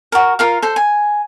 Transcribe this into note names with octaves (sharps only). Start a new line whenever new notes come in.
F#4 A#4
F4 A#4 F5
A4 C5
G#5